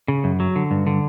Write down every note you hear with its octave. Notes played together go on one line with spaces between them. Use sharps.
C#3
F#2
F#3
D3
G2
D3